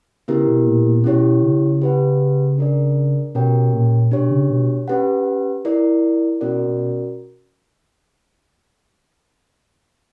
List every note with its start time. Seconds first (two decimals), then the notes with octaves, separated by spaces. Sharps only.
0.28 C#3 B3 E4 G4 A#4
0.48 B2
0.66 A#2
0.86 A#2
1.04 B2 C#4 E4 G4 C#5
1.43 C#3
1.82 G4 B4 F#5
2.58 D4 A#4 D5
3.35 B2 C#4 G4 A#4 C#5 G5
3.73 A#2
4.11 B2 D4 G4 C#5
4.31 C#3
4.50 B2
4.88 C#4 G4 B4 F#5
5.65 E4 A#4 D5
6.41 B2 C#4 F#4 A#4 D5
6.67 B2